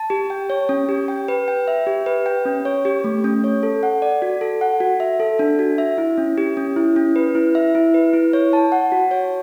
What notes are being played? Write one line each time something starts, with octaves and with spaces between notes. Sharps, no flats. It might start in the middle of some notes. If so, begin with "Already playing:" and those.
Already playing: A5
G4
G5
C#5
C#4
G4
G5
B4
G5
E5
G4
B4
G5
C#4
C#5
G4
A3
C#4
C#5
A4
F#5
D5
F#4
A4
F#5
F#4
E5
A4
D4
F#4
E5
E4
C#4
G4
C#4
E4
C#4
B4
E4
E5
E4
B4
E4
C#5
A5
F#5
F#4
C#5